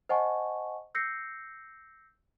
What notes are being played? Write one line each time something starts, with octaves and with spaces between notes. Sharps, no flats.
C5 D#5 F#5 G#5 A5 C#6
E6 G6 A#6 C7 C#7